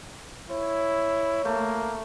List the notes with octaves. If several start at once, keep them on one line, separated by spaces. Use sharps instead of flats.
E4 C#5
A3 A#3